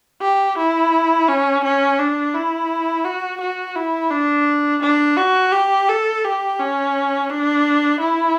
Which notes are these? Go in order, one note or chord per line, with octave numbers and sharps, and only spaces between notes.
G4
E4
C#4
C#4
D4
E4
F#4
F#4
E4
D4
D4
F#4
G4
A4
G4
C#4
D4
E4